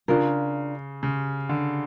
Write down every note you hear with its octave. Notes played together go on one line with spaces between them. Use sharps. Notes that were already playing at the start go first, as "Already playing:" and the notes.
C#3 D4 F4 A#4
C#3
D3